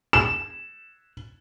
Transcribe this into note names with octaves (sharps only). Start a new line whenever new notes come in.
E7